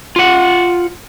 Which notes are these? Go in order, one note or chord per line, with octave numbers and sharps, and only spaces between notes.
F4 F#5